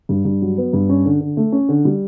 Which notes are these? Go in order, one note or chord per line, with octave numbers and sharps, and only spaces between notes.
G2
G2
F#3
B3
G2
C#4
D3
D3
A3
C#4
D3
G3